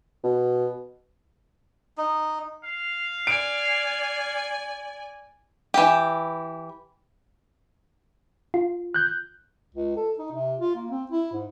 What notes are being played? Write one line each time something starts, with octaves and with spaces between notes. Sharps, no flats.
B2
D#4
F5
D5 G#5 D7
E3 G4
F4
F#6 G6
C#2
A4
D#4
C3
F4
A#3
C4
E4
G#2